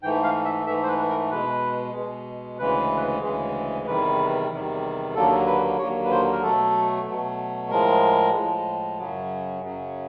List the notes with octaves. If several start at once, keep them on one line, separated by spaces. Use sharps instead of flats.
G#2 E3 A3 G5
F5
E5
G#2 E3 A3 E5
C5
B4
A#4
B2 G#3 B4
B2 G#3
D2 C#3 E3 G#3 B4
D2 C#3 E3 G#3
E2 C3 D#3 G3 B4
E2 C3 D#3 G3
D#2 D3 F#3 A#3 A4
B4
D#2 D3 F#3 A#3 C#5
B4
C5
A#4
B2 F#3 A3 A4
B2 F#3 A3
A2 F3 G#3 A#4
A2 F3 G#3
F#2 C#3 F#3
F#2 C#3 F#3